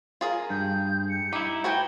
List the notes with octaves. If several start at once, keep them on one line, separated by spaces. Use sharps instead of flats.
F4 G#4 A#4
G2 G6
C#7
D#4 E4 G4
F#4 B4 G5 G#5